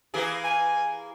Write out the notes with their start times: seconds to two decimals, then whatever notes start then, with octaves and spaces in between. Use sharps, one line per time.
0.14 E3 A#3 G#4
0.44 G#5